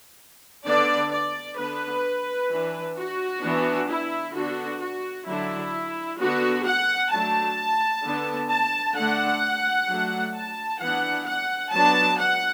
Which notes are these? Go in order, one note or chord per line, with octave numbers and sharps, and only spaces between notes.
D3 B3 D4 D5
D5
D3 B3 D4 B4
E3 D4
F#4
E3 B3 D4
E4
D3 B3 D4 F#4
F#4
D3 F#3 D4 E4
D3 B3 D4 F#4
F#5
F#3 A3 D4 A5
D3 B3 D4
A5
D3 A3 D4 F#5
F#3 A3 D4
A5
E3 B3 D4 F#5
F#5
F#3 B3 D4 A5
F#5